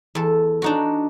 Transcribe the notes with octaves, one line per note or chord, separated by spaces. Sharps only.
E2 A4
D4 D#4 F#4